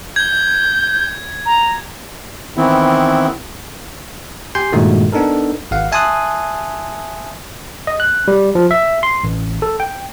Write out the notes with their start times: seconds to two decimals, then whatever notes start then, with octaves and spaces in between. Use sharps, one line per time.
0.16 G6 G#6
1.46 A#5
2.57 D#3 E3 B3 C4 E4
4.55 G4 G5 G#5 C6 G6 C7
4.72 G2 A#2 D#3 G#3 A3 F#4
5.12 B3 D4 D#4 A4 A#4
5.71 G#1 F5 F#5
5.92 E5 G#5 A5 C6 D#6 F#6
7.87 D#5
8.00 F#6
8.28 G3
8.55 F3
8.71 E5
9.03 C6
9.24 A1
9.62 A4
9.80 G5